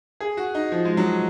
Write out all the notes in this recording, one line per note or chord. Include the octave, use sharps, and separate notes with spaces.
G#4
F#4
D#4
F3
G#3
F#3